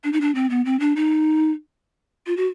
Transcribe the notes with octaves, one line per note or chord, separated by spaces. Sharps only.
D4
D#4
D4
C4
B3
C4
D4
D#4
F4
F#4